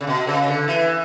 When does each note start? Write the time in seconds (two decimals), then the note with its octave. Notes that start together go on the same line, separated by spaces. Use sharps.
0.01 C#3
0.07 B2
0.27 C#3
0.48 D3
0.68 E3